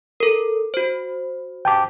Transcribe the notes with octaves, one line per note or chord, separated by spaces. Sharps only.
A4 A#4
F#4 C5
G5 A5 D6